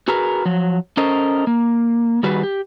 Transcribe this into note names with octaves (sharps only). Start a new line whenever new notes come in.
F#4 G#4 A#4 B4
F3 F#3
C#4 A4 A#4 C5 D#5
A#3
D#3 G3 F#4 G#4 B4
G4